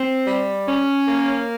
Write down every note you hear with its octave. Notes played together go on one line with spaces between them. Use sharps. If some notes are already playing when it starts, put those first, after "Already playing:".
Already playing: C4
G3
C#4
A#3